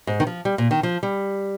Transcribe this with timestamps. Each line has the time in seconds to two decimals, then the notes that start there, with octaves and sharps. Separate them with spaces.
0.07 G#2
0.20 D#3
0.27 F3
0.45 G3
0.58 A#2
0.71 D#3
0.83 F3
1.03 G3